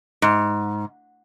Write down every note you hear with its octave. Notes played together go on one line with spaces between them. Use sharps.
G#2